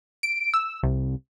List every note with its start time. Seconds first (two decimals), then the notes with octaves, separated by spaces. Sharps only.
0.23 D7
0.54 E6
0.83 C2